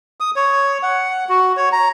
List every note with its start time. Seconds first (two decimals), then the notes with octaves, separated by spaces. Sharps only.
0.20 D#6
0.36 C#5
0.83 F#5
1.29 F#4
1.57 C#5
1.72 A#5